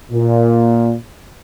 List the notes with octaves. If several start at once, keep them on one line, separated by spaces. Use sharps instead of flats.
A#2